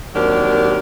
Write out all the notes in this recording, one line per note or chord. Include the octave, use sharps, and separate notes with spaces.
D#2 F#3 C4 D4 G4 A#4